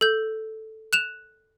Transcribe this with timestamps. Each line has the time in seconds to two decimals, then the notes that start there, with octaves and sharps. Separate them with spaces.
0.01 A4 G6
0.93 F#6 E7 F7